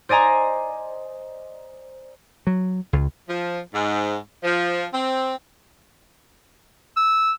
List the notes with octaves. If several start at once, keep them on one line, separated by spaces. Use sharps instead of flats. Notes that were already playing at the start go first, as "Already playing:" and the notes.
C5 D5 D#5 G#5 A#5
F#3
C#2
F3
G#2
F3
C4
E6